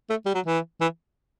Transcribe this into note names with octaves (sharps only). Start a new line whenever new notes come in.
A3
G3
F#3
E3
E3